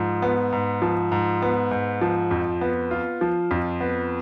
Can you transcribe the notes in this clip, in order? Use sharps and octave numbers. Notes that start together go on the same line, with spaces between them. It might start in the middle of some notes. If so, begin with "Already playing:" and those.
Already playing: G#2 F3
B3
G#2
F3
G#2
B3
G#2
F3
F2
B3
F4
F3
F2
B3